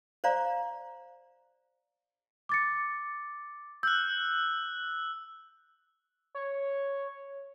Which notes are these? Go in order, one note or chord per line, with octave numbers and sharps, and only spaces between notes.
C5 D5 F5 A#5
D6 A6 C#7
E6 F#6 G6
C#5